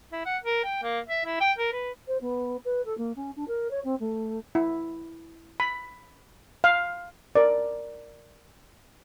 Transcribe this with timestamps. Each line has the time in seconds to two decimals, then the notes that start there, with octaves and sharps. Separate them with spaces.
0.12 E4
0.26 F#5
0.43 A#4
0.64 G5
0.83 A#3
1.08 E5
1.25 E4
1.41 G5
1.59 A#4
1.72 B4
2.07 C5
2.21 B3
2.64 B4
2.85 A4
2.97 A#3
3.16 C#4
3.36 D4
3.47 A#4
3.70 C#5
3.84 C4
3.99 A3
4.55 E4
5.60 B5
6.64 F5
7.35 A#4 D5